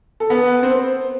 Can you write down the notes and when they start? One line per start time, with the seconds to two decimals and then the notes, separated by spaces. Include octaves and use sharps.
0.20 A4
0.30 B3 B4
0.62 C4 C5